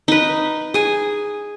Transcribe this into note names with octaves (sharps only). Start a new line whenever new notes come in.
D#4 B4
G#4 G#5